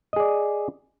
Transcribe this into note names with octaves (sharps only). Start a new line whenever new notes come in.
G#4 D5 D#5